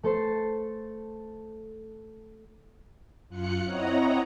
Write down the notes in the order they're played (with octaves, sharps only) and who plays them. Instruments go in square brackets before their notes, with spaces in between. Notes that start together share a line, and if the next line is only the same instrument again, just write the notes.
[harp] A3 A4 C5 C7
[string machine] F#2 F4 F#6 C#7
C4 E4 C#5 D#5 F#5 A#5